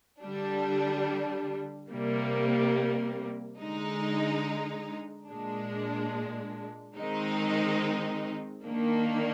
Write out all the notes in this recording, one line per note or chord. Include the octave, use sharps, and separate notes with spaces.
D3 G3 D4
C3 G3 A#3
D3 G#3 D#4
A#2 G#3 D4
D#3 G#3 C4 D#4
D#3 A#3 D4